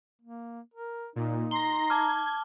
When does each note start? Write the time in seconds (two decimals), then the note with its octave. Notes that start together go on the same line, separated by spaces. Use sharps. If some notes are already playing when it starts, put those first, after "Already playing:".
0.22 A#3
0.74 A#4
1.16 A#2 D#4
1.51 A#5 C6 A#6 G7
1.90 A5 D6 F6 G#6